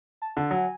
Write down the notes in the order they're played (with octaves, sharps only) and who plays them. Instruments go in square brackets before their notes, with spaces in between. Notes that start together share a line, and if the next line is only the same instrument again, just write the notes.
[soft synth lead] A5
[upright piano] D3 [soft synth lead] A5
[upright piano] F#3 [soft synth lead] G#5